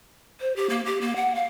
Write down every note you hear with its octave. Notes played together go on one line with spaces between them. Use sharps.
C5
G4
A#3
G4
A#3
F#5
F5